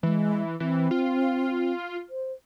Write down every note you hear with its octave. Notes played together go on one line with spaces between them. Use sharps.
E3 G#3
E3 C4
F4
C5